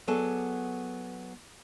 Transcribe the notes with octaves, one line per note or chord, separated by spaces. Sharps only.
F#3 B3 G#4 A4 D5